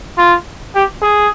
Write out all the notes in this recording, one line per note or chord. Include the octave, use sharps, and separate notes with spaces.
F4
G4
G#4